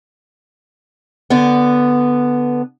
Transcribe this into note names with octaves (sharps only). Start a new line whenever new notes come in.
D3 B3